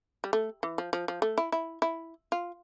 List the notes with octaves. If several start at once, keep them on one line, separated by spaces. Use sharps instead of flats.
G3
A3
E3
F3
F3
F3
A3
E4
E4
E4
F4